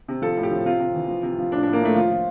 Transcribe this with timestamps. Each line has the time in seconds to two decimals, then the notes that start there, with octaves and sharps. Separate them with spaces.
0.08 C3
0.22 F3 A4
0.37 A2
0.43 G4
0.51 F3
0.66 C3 F4
0.80 C3
0.94 E3
1.08 F3
1.23 C3
1.38 F3
1.52 A2 D4
1.63 A2 D4
1.73 A#3
1.81 A2 A3
1.95 F3 F4
2.10 F3